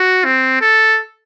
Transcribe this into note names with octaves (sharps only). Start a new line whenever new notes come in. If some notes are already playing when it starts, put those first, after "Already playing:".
Already playing: F#4
C4
A4